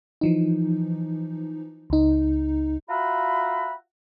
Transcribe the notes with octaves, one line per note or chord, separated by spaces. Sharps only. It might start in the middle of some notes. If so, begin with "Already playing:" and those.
E3 F3 D#4
C#2 D#4
F4 F#4 E5 F#5 A#5 B5